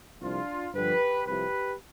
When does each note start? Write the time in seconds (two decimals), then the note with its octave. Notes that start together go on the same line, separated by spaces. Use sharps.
0.21 C2 C3 F3 D4 F4
0.73 G2 D3 F3 G4 B4
1.26 C2 C3 F3 G4 B4